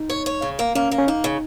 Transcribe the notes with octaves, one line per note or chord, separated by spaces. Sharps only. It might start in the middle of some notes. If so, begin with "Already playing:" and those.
Already playing: D#4
C#5
C#5
C#3
A#3
A#3 C#4
A#3
C#4
A#3 D#4
C#3